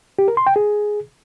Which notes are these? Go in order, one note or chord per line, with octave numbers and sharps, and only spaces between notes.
G4
A#4
C6
G5
G#4